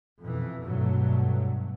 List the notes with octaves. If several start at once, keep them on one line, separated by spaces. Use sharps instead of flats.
F2 B2 E3
G2 B2 F#3 A3